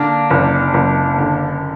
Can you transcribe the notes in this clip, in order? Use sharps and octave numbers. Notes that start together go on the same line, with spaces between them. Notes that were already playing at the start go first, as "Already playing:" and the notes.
Already playing: D3 A#3 D4
F#1
F#1
D3